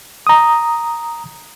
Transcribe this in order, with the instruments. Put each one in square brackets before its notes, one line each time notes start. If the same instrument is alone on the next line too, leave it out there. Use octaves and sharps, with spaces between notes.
[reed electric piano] A#5 D#6